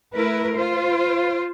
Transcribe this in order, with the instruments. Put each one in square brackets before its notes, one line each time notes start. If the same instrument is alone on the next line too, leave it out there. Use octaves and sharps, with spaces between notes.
[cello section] A3 E4 A#4 B4
F4 C5